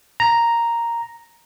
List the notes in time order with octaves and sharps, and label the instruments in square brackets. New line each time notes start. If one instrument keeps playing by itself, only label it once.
[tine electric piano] A#5